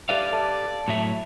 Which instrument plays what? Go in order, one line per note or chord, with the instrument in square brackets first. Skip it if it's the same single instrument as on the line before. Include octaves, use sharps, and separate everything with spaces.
[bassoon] A3 [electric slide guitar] G4 B4 F5 [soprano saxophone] D5
[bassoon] A4
[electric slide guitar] A2 F#3 E5